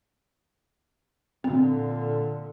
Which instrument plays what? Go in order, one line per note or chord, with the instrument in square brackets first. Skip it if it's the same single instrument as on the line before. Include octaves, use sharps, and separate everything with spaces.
[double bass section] A#2 D3 [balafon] C4